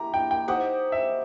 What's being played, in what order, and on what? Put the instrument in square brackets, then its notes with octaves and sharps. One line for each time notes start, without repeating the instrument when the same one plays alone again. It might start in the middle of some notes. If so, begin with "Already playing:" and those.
Already playing: [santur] E4 G4 [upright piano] A#5
[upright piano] G5
G5
[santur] D#4 G4 C5 D#5 [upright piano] F#5
[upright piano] E5